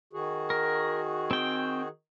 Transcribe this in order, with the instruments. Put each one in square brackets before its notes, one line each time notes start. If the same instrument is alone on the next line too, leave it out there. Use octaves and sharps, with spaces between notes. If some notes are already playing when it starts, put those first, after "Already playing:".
[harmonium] D#3 F#4 G#4
[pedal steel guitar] A#4
C4 G5